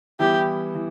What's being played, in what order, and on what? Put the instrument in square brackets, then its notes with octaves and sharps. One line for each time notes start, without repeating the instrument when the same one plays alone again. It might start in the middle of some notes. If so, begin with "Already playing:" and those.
[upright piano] E3 G3 B3 E4 [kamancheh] G4
[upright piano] E3